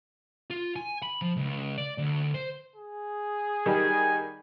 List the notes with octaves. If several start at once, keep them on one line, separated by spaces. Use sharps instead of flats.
F4
G#5
B5
F3
C#2
D5
D2
C5
G#4
D#3 G3 G#5